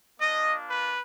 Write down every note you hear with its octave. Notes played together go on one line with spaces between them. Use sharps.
A#3 D4 F4 D#5
B4